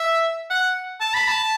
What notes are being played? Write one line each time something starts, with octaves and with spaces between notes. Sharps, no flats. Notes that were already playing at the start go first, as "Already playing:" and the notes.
Already playing: E5
F#5
A5
B5
A5